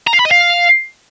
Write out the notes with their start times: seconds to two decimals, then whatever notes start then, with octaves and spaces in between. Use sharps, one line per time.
0.07 A#5
0.13 F5
0.19 B5
0.25 D#5
0.31 F5